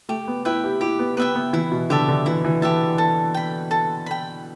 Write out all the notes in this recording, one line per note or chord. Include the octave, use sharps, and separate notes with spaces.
A3 G4
B3
E4 B4 E5 G5
G4
E4 G4
B3
B3 B4 E5 G5
B3
E3 E4
B2
D3 G4 E5 A5
D3
E3 E4
E3
E3 G4 E5 A5
A4
G5 B5
A4
G5 B5